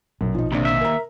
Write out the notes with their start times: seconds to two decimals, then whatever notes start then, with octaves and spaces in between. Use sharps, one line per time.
0.21 A#1 F#2 B2
0.35 F3 D#4
0.52 D#2 C3 D4
0.65 E5
0.81 A#4 A#5